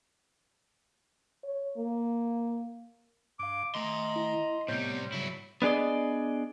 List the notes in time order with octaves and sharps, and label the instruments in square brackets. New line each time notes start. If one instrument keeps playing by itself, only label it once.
[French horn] C#5
A#3
[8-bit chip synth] G2 F5 [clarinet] D6
[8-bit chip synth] D#3 A3 [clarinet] D#5 [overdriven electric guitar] A#5 C6
[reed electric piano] E4
[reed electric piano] A2 C#5 G6 [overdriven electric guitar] C3 G3 [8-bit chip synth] B3
[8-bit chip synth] G#2 C#3 G3 [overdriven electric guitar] F#3 E4
[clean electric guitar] B3 D4 G#4 D5 D#5